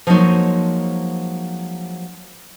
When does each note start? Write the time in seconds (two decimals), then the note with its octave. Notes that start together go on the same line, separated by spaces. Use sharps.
0.07 F3 F#3 G#3 A#3 D#4 C#5